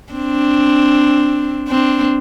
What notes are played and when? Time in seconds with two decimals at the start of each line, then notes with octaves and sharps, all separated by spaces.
0.13 C4 D4
1.68 C4 D4